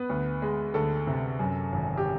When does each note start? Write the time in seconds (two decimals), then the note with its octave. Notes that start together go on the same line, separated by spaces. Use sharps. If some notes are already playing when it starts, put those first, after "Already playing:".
Already playing: B3 B4
0.09 D2
0.42 G#3
0.74 D2 A4
1.07 C3
1.39 F#2
1.72 G#1
1.98 G4